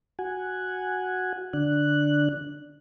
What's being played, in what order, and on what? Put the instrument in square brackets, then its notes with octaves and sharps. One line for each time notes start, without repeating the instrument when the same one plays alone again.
[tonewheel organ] F#4 F#5 G#5
D3 D4 F#6